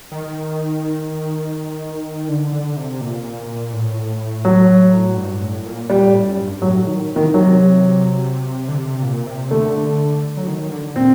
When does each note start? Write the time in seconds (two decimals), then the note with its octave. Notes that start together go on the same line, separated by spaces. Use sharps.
0.12 D#3
2.29 D3
2.52 D3
2.76 C3
3.01 A#2
3.73 A2
4.45 F#3
5.17 G2
5.42 A2
5.66 A#2
5.89 A#2 G3
6.07 A2
6.26 F#2
6.44 G2
6.62 A2 F#3
6.86 D#3
7.10 C3
7.16 D#3
7.34 C3 F#3
8.68 D3
8.78 C3
9.02 A#2
9.26 C3
9.50 D3 A3
10.37 F#3
10.47 D#3
10.71 D3
10.95 A#2 C4